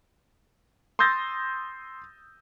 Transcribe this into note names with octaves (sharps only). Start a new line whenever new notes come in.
C6 D#6 E6 G6 A6 A#6